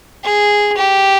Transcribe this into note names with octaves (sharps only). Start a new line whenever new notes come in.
G#4
G4